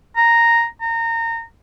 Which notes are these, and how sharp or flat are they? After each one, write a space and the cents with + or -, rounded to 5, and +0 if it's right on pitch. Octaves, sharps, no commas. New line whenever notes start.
A#5 -5
A#5 -25